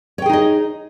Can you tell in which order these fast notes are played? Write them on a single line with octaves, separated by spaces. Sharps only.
C#5 G5 G#4 D#4 D#5